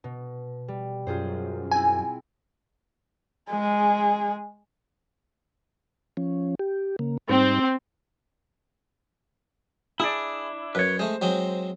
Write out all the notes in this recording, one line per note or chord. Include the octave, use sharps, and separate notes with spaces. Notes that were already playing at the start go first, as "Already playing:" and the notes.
B2
G3
F#2 F4 G#4 C5
C4 E4 G#5
G#3 G#4
F3 C#4
G4
C#3 A#3
G#2 G3 C4 D#4
D4 E4 G#4
F#2 B4 C#5
G#3 A3 C5
F#3 G#3 C4